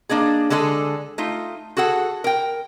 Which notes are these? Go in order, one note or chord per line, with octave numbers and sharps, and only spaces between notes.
A#3 D4 D#4 G#4
D3 G#3 A4 G#5
A3 D#4 F4
F#4 G#4 A4 F#5
A#4 G5